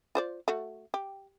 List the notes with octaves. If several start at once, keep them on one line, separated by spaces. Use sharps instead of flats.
F4 C5 D5
A3 F#4
G4